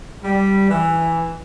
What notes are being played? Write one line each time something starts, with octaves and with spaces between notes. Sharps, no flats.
G3
E3